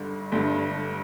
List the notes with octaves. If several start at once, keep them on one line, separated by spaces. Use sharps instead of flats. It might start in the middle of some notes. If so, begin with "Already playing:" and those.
Already playing: G1 G2 D3
G1 G2 D3